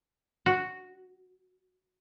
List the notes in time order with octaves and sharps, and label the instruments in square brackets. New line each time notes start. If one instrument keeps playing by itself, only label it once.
[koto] F#4